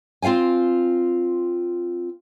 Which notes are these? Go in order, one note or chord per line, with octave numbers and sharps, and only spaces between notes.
C4 F4 F5 G5 G#5